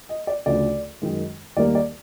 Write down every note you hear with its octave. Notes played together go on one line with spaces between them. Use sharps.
D#5
D5
D2 C#3 F3 A3 D5
F#2 D#3 G#3
D#2 D#3 G3 A#3 D5
D5